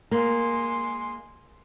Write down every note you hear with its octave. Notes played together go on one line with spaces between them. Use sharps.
G#3 A#3 C6